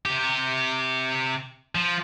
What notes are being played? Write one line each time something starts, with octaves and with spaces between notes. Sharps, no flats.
C3 G4
F3